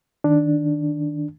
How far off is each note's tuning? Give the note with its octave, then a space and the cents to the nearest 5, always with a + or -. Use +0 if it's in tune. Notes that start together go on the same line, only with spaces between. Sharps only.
D#3 +0 D4 +0